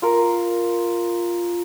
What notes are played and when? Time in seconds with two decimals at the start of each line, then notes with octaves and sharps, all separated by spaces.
0.02 F4 A#4